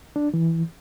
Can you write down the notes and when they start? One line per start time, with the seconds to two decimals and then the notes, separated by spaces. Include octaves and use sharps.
0.16 D4
0.34 E3